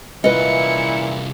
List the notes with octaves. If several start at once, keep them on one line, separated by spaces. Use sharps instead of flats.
C2 A#2 E3 E4 F4 B4 D#5 C#7